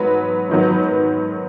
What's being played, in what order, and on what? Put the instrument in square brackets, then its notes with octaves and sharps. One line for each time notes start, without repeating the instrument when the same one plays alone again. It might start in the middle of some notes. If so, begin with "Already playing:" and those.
Already playing: [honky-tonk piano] G#2 F#3 B3 B4
G#2 D#3 F#3 B3